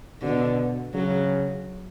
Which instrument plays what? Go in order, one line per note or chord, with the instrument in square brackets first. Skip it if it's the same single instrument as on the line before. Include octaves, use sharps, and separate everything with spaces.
[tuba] B2 [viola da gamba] D3
[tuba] C#3 [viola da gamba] F#3